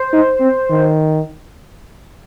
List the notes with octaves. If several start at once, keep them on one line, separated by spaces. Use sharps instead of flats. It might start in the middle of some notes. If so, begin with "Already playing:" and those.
Already playing: C5
D#4
C4
D#3